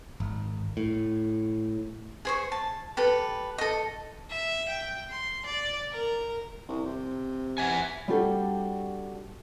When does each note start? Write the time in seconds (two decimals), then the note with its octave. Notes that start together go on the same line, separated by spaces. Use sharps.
0.20 G#1
0.77 A2
2.25 G#4 C5 C#6
2.52 A5
2.97 G4 A4 B4
3.58 A4 D#5
4.29 E5
4.68 G5
5.10 C6
5.46 D5
5.91 A#4
6.68 C2
6.86 C3
7.58 E5 F#5 G#5
8.08 G3 C4 D4 F#4 G4 A4